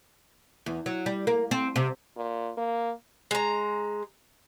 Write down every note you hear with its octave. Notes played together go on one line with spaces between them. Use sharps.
E2
F#3
G3
A#3
C4
C3
A#2
A#3
G#3 A#5